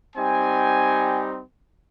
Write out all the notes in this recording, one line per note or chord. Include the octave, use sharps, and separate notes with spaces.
G3 C4 D#4 G4 G#5